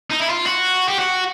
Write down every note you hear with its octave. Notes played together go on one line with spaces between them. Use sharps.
D#4
E4
F4
F#4
G4
F#4